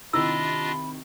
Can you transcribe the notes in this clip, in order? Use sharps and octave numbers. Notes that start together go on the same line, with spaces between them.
C3 D#3 D4 E4 F4 D#5 B5 E6